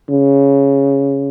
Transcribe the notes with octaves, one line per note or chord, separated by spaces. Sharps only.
C#3